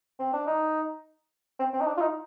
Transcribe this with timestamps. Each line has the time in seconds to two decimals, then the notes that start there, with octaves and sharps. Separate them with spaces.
0.19 C4
0.33 D4
0.46 D#4
1.60 C4
1.74 C4
1.81 D#4
1.87 D4
1.97 F4
2.01 D#4